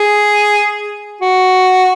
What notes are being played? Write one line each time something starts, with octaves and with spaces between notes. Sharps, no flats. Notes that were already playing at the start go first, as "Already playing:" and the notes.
Already playing: G#4
F#4